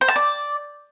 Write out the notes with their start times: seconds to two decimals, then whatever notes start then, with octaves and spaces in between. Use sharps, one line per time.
0.01 C5
0.08 A5
0.16 D5